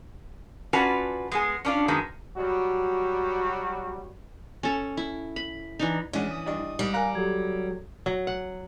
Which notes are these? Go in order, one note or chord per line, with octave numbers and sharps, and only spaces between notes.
C#4 F4 F#4 B4 D5 A5
G#3 B3 G#4
C#4 D4 F4
F#2 D#3 G#3 B3
F#3 G3 F#4
C#4 A4
E4
B5
E3 D4 D#4
E3 G#3 C#4 D4 F#5
D#6
G2 D4 D#5
G#2 G3
A#4 F5 G#5 A#5 F#6
F#3 G4 A4 G#6
F#3
F#5